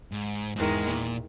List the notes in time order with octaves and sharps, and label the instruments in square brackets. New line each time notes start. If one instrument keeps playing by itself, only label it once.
[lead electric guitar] G#2
[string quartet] E2 D#3 G#3 [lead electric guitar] G#2
[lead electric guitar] A#2